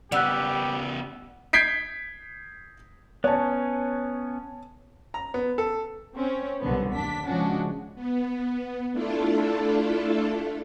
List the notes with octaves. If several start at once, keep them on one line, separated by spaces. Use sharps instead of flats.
C#3 G3 B3 G4 F#5 E6 F#6
G6 G#6 B6 C7 D7
B3 C#4 C#5 G#5 A5
A#5
B3
A4
C4 C#4 C#5
C2 B2 D3 F#3 B3
D#2 D4 B6
C#3 F3 G#3 C#4 D4 F#4
B3
A3 D4 E4 F4 A4